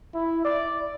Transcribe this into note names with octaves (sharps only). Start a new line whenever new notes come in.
E4
D5